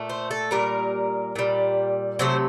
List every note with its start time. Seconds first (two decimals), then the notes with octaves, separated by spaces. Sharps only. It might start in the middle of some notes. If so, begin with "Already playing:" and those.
Already playing: A#2 A3
0.10 C5
0.31 A4
0.51 A#2 G3 A#4
1.36 A#2 G3
2.19 C3 F#3 A3 C5